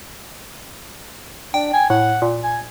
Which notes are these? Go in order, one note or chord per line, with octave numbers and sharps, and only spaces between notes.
D4 G5
G#5
A2 F#5
A#2
G#5